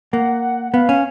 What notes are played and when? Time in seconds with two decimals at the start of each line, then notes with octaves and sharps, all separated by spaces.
0.12 A#3 F#5
0.74 B3 F5
0.89 C#4